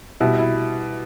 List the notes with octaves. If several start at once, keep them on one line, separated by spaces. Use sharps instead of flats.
B2 G3 E4
E4